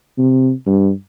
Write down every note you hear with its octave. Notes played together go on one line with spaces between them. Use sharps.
C3
G2